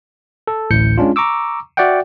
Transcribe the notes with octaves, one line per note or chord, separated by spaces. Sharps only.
A4
A1 D2 A2 G6 C#7
G#3 C#4 D4 F4
A#5 C#6 D6 E6
F#4 D5 E5 F#5 G5